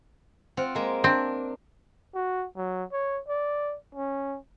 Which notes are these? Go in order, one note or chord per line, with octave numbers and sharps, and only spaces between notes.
C4 F4 F#5
G#3 A#3
C4 D4
F#4
F#3
C#5
D5
C#4